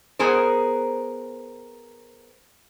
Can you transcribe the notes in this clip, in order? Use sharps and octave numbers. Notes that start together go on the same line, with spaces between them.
B3 G#4 A#4 C5